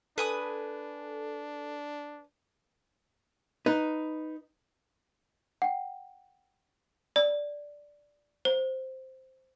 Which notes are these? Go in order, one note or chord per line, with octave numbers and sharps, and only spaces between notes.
D4 A4 B4 G#5 D#6
D#4 B4
F#5 G5
D5
C5